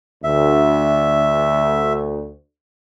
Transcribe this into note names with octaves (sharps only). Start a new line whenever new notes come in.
D2 E5